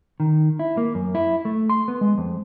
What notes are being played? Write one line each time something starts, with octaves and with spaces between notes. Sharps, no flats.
D#3
E4
A#3
F#2
E4
A3
C6
B3
G#3
F2